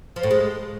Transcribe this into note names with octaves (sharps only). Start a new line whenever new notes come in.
F3
A2
G#3